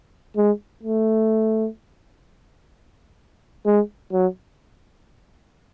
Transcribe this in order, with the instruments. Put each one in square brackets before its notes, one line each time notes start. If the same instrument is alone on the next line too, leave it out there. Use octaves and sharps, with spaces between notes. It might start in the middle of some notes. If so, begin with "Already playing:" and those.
[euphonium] G#3
A3
G#3
F#3